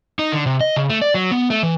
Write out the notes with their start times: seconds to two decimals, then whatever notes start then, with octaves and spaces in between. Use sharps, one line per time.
0.19 D#4
0.32 D3
0.46 C3
0.60 D#5
0.76 C#3
0.90 A3
1.01 D5
1.14 F#3
1.31 B3
1.50 A3
1.63 E3